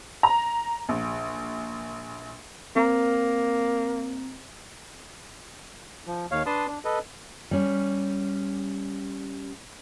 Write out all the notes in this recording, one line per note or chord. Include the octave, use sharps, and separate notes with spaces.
A#5
A#1
A#3 C4 A#5
F3
D#2 C#5 F5
D4 B4 A5 C6 D#6
D4
A4 B4 D#5
G3 C#4